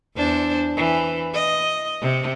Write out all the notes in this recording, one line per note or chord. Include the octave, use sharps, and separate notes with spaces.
E2 D4 C5
E3
D#5
C3